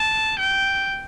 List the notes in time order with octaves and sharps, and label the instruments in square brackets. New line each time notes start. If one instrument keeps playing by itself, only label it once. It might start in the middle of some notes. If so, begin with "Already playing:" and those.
Already playing: [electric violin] A5
G5